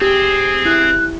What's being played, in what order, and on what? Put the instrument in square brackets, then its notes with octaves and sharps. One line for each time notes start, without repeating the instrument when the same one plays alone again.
[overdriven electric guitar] C4 [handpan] G4 [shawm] G#4
[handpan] E4 [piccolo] F#6